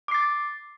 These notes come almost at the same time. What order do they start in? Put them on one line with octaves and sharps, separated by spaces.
D6 C7 A6